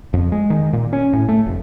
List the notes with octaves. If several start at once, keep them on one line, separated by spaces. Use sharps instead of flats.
F2
G#3
D#3
A#2
C#4
A2
A3
F1